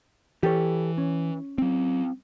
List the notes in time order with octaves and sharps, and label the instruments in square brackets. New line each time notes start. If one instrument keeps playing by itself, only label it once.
[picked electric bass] E3 [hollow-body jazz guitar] G4 A4 C#5
[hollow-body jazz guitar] C#4
[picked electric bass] F#3 C4